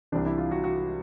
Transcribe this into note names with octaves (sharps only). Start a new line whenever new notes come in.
C2 C3 E3 D4
E4
F4
F#4
F#4